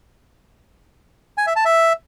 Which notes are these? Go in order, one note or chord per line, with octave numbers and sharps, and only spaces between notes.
G#5
E5
A5
E5